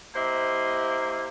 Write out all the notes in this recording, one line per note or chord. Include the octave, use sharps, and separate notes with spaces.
A#3 E4 G4 C5 D#5